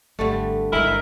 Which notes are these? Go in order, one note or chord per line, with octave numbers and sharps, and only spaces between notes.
G#1 D3 G3 A3
A1 G#2 D#4 E4 A#4